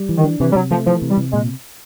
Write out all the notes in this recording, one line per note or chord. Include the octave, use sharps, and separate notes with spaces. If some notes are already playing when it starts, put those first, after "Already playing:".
Already playing: G3
E3
D#3
D4
C3 E3
G3
C3 F#3
F3 A3
E3 F3
C3
G3
C3
A#2 G#3